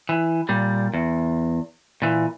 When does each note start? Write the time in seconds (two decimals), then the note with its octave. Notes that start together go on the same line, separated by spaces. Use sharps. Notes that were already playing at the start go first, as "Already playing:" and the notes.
0.09 E3
0.49 A#2 G3
0.94 E2
2.02 A#2 E3